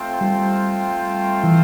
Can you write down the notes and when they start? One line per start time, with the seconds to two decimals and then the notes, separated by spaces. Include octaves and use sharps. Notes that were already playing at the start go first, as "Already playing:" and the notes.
Already playing: A3 C4 F4 C5 G5
0.21 G3
1.44 E3